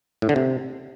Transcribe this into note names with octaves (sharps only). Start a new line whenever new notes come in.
A2
D3
C3